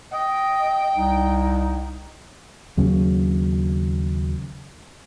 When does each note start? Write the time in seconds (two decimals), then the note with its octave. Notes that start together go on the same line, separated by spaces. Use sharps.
0.12 D#5 G5
0.96 C2 D#4
2.77 D#2 C#3 F#3 C#4